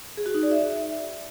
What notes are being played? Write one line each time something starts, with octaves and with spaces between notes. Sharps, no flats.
G#4
F#4
D#4
D5
E5